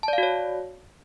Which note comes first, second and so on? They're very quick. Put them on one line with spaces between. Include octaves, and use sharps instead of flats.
A5 D5 F5 F#4 C#5